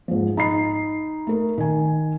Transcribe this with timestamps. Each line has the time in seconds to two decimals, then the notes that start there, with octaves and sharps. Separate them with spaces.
0.08 G#2 F3
0.37 D#4 B5 C7
1.27 A3 A#4
1.58 D#3 G#5